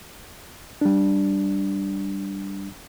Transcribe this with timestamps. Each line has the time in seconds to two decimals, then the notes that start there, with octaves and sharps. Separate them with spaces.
0.81 G3 D4